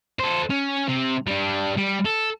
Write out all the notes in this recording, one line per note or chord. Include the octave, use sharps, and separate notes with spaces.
A4 C5
C#4
C3
G3 D4
G3
A4